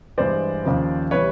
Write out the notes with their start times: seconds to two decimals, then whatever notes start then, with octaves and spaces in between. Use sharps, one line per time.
0.18 G2 E3 G#3 C5 D5
0.64 D#2 C#3 F3
1.11 E3 G3 B4 C#5